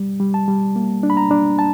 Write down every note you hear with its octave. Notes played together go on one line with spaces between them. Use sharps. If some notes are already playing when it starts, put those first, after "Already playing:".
Already playing: G3
G3
A5
G3
A#3
D4
B5
A#5
D4
A5